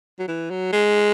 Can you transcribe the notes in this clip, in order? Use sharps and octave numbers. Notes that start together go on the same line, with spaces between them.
F#3
E3
F#3
G#3